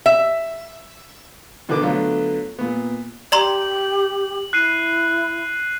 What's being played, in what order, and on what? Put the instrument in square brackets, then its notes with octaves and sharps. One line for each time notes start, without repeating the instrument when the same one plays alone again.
[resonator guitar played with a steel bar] E5
[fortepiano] B2 D3 D#3 B4 D6
D3 F#3 A3 B3 F4
A#2 B3
[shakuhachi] G4 [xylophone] D5 A#5 C6 [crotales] F#7
[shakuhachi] E4 [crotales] F#6 C7 D#7